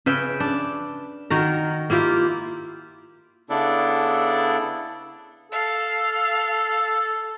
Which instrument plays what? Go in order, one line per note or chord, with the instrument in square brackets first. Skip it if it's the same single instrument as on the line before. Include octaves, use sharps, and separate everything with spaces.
[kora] C#3 B4 E5 G5
D4
D#3 F#4 A#4
A#3 E4 F4 G4
[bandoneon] C#3 B3 D4 E4 A4 D5
[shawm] A4 [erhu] F5